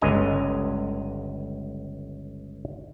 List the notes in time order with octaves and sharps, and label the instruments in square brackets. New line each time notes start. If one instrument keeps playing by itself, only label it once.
[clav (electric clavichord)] G1 C#2 D3 D#5 G#5 A#5